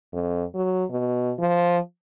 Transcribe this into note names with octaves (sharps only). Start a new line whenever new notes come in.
F2
F#3
B2
F3